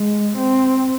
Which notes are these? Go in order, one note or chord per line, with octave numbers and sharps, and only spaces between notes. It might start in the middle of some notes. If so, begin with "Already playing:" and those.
Already playing: G#3
C4